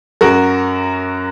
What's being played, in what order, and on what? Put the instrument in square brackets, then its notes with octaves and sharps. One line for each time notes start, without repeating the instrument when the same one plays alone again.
[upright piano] F#2 F#4 A#4